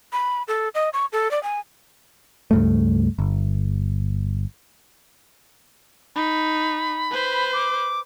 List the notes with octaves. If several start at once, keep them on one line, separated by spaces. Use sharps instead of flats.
B5
A4
D#5
C#6
A4
D5
G#5
C#2 G2 A3
G1
D#4 B5
B4 C5
D6